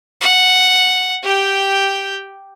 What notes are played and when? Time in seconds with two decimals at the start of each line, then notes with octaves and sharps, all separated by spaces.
0.21 F#5
1.23 G4 G5